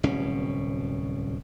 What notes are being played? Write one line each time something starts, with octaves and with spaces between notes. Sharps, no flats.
D1 C2 B2 C#4